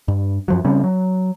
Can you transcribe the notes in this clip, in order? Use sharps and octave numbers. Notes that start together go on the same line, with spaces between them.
G2
F#2 F3 F#3
C#3 G3 C4 C#4
F#3